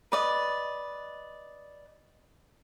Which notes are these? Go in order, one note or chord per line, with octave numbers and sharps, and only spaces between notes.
B4 D5 D#5